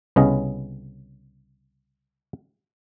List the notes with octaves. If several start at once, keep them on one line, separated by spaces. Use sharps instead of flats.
C2 C#3 B3 C#4 D#5